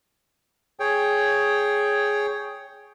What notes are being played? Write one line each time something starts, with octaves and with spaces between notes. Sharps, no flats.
G#4 C#5 G5